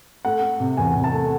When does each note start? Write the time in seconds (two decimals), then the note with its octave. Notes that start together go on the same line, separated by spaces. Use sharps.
0.25 A3 F#5
0.42 A3
0.60 C3
0.77 E2 G#5
0.95 C3
1.04 A5
1.13 A3